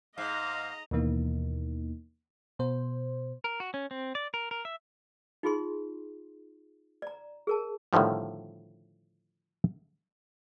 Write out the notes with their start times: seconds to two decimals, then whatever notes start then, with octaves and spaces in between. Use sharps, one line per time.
0.18 G#2 D#5 F5 A#5
0.91 D#2 B2 E3 A#3 D#4
2.59 B2 C5
3.44 A#4
3.60 F#4
3.74 C#4
3.91 C4
4.15 D5
4.34 A#4
4.51 A#4
4.65 E5
5.43 D#4 F4 G#4 C6
7.02 D5 A#5
7.47 G#4 A#4 A5
7.93 A2 D3 D#3 F3 G3